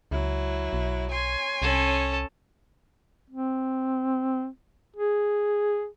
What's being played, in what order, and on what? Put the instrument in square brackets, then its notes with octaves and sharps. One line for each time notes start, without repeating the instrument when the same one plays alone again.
[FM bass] C#2 [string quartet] F#3 E4
[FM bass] B1
[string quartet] C#5 G#5 C6
[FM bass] C2 [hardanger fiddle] C#4 A4
[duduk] C4
G#4